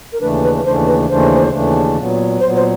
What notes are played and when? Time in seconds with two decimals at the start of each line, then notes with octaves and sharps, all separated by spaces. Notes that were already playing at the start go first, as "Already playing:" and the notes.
0.13 A#4
0.20 D#2 C#3 E3 A3 D4 B4
0.43 B4
0.65 D#2 C#3 E3 A3 D4 C5
0.87 B4
1.09 D#2 C#3 E3 A3 D4 C5
1.53 D#2 C#3 E3 A3 D4
1.96 A#2 F#3 B3
2.40 A#2 C5
2.44 F#3 B3
2.56 C5